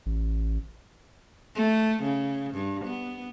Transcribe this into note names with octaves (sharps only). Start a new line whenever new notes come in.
A1
A3
C#3
G2
B3